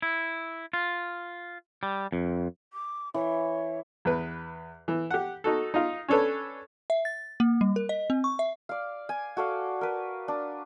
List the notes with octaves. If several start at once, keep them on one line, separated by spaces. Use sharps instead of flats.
E4
F4
G3
F2
D6
E3 C#5
E2 B4
E3
G4 F#5
D#4 F#4 A4
D#4 F4
C#4 D4 A4 B4 C#5
E5
A6
A#3
G3
A#4
D#5
C4
C#6
E5
D5 F5
G#5
F#4 A4 D5 F5
A#4 B4
D4